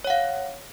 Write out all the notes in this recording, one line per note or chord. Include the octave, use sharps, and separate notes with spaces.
C#5 F5 F#5